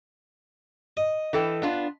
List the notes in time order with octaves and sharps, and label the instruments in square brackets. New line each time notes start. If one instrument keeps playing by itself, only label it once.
[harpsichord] D#5
[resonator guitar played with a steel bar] E3 A4 G5
B3 D4 F4